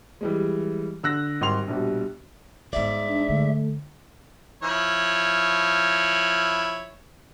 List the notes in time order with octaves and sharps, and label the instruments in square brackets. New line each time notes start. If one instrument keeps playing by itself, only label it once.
[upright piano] E3 G3 G#3
D3 E6 F#6 A#6
G#1 G3 G4 C6 F7
A#1 B2 G3
[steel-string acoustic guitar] G#2 D5 [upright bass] G3 B3 [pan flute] E5
[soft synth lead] D4
[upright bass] D3 G#3 [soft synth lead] A3
[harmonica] F3 E4 C#5